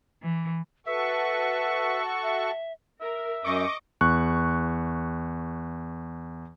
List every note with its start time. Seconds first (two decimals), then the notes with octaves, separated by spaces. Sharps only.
0.22 E3
0.86 F#4 A4 B4 E5 C#6
2.23 E5
3.01 A#4 E5
3.44 F#2 D#5 C#6 D6
4.01 E2 C#6 F#6